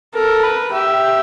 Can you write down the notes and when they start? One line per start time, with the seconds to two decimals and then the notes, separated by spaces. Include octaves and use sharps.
0.14 A4 A#4
0.43 B4
0.72 G4 E5